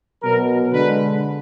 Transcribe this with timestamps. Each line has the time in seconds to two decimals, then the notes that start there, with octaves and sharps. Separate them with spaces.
0.23 B2 F#3 A#4
0.73 D3 G#3 B4